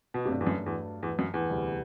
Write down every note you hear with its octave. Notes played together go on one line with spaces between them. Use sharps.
B2
G2 C3 F#3 A3 D4
E2
F#2
E2
E2
F#2
E2
D2 C3 G3